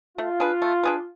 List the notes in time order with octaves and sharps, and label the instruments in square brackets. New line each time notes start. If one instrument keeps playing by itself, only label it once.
[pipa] A3 [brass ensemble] F4
[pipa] D4 G#4 B4
A3
D4 G#4 B4